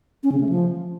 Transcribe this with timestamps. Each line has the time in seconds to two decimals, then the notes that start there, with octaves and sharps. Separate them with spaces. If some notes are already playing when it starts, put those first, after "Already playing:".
0.23 C#4
0.32 C#3
0.41 A3
0.49 F3